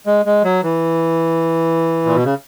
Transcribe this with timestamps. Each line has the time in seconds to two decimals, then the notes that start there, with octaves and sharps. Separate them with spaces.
0.06 G#3
0.25 G#3
0.44 F#3
0.63 E3
2.06 A#2
2.15 B2
2.25 C#3